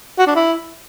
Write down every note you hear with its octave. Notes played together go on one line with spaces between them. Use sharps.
F#4
D4
E4